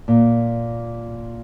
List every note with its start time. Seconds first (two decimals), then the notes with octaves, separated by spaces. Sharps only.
0.08 A#2